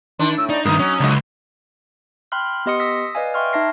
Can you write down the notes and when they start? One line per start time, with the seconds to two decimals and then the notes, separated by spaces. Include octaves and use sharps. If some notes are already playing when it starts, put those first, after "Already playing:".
0.19 D#3 D4 C6
0.38 A2 E6
0.49 D#4 D5
0.65 G2 D#3 D#4 A#4 D#6
0.79 F#3 C#4
1.00 C#2 D3 F#3 D#5
2.32 G5 B5 C6 F6 F#6
2.66 B3 G4 D#5 C6 D#6 C#7
2.80 D#6 E6 A#6 B6
3.15 B4 D5 D#5 F5 G#5
3.34 E5 G5 C6 C#6 F6
3.53 D#4 E5 A5 A#6 C7